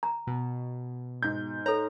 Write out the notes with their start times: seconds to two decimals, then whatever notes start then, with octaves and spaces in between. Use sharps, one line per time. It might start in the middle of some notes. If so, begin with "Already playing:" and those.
0.03 A#5
0.27 B2
1.23 G#2 G6
1.66 A4 C#5 A#5